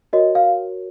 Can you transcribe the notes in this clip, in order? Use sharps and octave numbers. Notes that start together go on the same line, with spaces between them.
F#4 A#4 C#5 D#5
F5